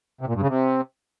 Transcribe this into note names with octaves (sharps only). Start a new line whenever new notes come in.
C3
A#2
G2
C#3
C3